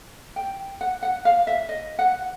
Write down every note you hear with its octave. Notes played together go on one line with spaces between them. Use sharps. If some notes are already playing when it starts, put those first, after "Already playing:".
G5
F#5
F#5
F5
E5
D#5
F#5